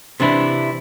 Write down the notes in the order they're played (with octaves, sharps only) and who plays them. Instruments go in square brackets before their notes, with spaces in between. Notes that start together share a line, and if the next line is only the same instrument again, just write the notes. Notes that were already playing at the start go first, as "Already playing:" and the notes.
[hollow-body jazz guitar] C3 E3 D4 E4